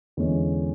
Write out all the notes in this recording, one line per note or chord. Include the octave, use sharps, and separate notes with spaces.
E2 D3 G#3 C#4